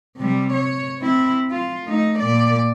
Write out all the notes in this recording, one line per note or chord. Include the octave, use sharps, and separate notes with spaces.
C3 G3
C#5
C4 E4
F4
A3 D#4
A#2 D5